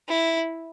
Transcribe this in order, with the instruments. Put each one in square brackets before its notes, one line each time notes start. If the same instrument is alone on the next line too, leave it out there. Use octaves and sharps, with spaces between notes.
[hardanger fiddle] E4